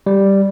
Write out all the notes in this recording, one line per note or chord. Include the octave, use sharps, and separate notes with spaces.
G3